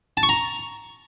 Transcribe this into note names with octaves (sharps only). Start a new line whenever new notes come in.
A5
C#6
A#5